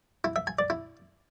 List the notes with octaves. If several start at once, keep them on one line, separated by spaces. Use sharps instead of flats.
E4
E5
G#5
D5
E4